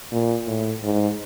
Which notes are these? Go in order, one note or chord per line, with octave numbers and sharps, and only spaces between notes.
A#2
A2
G#2